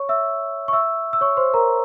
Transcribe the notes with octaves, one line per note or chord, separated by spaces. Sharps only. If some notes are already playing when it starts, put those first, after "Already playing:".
Already playing: C#5 C#6
E5 E6
C#6
E5 E6
E6
C#5 C#6
C5 C6
A#4 A#5